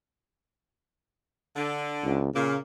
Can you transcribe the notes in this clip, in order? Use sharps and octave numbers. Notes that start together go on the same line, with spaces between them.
D3
C#2
A#2 C#3 A#3